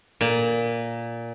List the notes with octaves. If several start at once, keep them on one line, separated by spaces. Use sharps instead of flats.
A#2